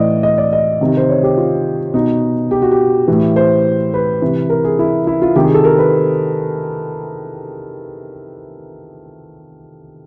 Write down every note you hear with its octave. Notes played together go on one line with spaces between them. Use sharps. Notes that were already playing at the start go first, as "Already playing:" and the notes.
Already playing: A2 E3 D5 D#5
D#5
D5
D#5
C3 D#3
C5
C#5
G4
F4
B2 D#4
G4
F#4
G4
A2 E3
C5
B4
C3 E3
A#4
G#4
E4
E4
F4
C3 D#3 G4
G#4
A4
A#4
B4